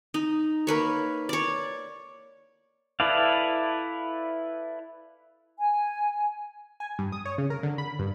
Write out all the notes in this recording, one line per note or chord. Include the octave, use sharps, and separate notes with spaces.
D#4
A#3 A#4 B4 C#5
C#5 D5
E4 A4 B4 D5 F5
G#5
G#5
G2
D#6
C#5
C#3
A#4
D3
B5
G2